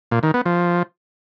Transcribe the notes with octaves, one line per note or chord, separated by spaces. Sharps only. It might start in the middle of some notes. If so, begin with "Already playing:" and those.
A#2
D#3
B3
F3